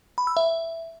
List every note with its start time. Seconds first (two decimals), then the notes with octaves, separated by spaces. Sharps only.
0.18 B5
0.27 E6
0.37 E5